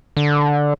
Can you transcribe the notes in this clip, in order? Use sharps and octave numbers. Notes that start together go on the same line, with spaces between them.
D3